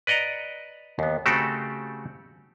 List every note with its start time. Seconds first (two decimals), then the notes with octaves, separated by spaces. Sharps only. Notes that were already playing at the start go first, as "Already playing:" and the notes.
0.07 B4 D5 D#5 F#5 A#5
0.99 D#2 B3
1.26 C#3 A3 C4 F#4 G4 A4